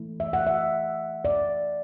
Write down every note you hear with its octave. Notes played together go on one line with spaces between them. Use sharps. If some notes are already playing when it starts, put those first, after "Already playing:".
Already playing: E3 A3 E4
E5
F#5
E5
D5